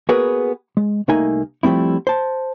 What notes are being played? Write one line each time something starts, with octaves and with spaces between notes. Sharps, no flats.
A#3 B3 F#4 G#4 A#4 B4
G#3
C2 A3 A#3 D#4 G#5
F3 G3 A3 C4 E4
C5 A5